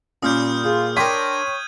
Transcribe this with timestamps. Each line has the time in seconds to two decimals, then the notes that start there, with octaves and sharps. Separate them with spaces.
0.23 A#2 G3 C#4 D#6 F6 G6
0.64 F4 G#4
0.97 D4 A#4 C#5 G5 C6 G#6 B6 D#7